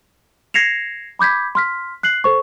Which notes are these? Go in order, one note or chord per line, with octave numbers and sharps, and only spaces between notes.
G#6 A#6 C7 C#7 E7 F7
B5 D6 G6 G#6 B6
C6 F6 B6
F#6 C7 F#7
A4 C5 C#6